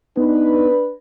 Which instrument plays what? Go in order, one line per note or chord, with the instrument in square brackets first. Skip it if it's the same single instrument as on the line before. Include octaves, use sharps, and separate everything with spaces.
[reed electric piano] B3 [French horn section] D4 B4 [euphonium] D#4